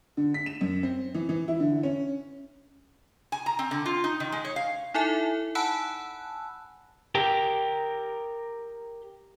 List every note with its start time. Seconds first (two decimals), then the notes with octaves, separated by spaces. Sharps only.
0.17 D3
0.34 B6
0.46 E7
0.61 F#2
0.83 C4
1.15 E3
1.29 E3
1.48 E4
1.60 D3
1.83 C#4
3.32 G#5
3.46 A#5
3.59 C4
3.71 D3
3.86 F4
4.04 D#4
4.20 D#3
4.32 G#3
4.45 C#5
4.56 F5
4.94 D#4 E4 A4 E5 G#5
5.55 F#5 G#5 A5 B5 E6 F#6
7.15 G4 A#4 G5